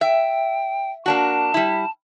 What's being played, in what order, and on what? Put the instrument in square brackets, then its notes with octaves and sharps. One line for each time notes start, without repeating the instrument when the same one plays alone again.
[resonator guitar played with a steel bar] E5 [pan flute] G5
[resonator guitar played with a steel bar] A#3 D4 F#4 [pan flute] A5
[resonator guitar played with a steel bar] G3 E4